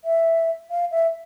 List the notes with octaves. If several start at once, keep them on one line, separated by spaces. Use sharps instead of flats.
E5
F5
E5